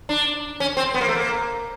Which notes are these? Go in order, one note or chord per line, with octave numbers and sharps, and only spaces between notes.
D4
C#4
C4
B3
A#3
A3
A#3